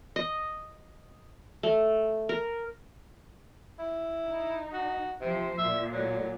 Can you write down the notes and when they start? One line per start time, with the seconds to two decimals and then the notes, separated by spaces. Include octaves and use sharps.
0.16 D#5
1.63 A3
2.29 A#4
3.79 E4
4.28 D#4
4.73 F#4
5.21 C3 F3 C5
5.58 A#2 E5
5.92 F#3